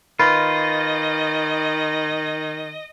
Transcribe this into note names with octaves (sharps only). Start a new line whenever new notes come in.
D#3 F4 B4 D#5